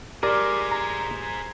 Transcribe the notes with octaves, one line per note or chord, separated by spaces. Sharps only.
G4 G#4 A#4 C5 D5
A#5